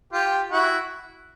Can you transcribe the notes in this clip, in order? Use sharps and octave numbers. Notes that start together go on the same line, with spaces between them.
F4 G4
E4 F#4